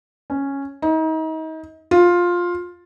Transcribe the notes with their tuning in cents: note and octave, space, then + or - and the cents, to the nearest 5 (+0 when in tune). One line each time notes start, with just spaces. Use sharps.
C#4 -5
D#4 +35
F4 +10